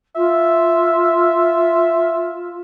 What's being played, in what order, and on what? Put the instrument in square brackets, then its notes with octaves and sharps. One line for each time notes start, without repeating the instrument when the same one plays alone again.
[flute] F4 [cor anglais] E5